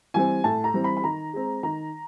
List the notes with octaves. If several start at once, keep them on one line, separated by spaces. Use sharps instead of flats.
E3 G3 C4 G#5
A2 A5
A#5
E3 G3 C4
B5
B5
D#3 A#5
G#3 C4
D#3 A#5